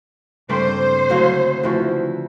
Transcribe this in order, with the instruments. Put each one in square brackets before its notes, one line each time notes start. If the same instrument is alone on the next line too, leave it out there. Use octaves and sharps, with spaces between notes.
[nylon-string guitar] G2 [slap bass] C#3 G3 [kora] A3 A#3 C4 [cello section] C5
[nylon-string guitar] D2 F5 [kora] F#3 E4 F#4
[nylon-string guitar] D2 E4 [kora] E3 F3 F#4